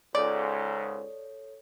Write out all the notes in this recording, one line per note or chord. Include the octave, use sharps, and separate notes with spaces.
C#2 G#2 A4 C#5 D5